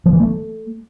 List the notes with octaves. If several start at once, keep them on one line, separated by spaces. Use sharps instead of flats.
F3
E3
A3